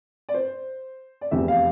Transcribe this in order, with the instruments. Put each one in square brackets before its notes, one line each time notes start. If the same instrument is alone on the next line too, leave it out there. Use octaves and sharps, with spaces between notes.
[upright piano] D5
C5
D5
F1 E2 C3 E5
F5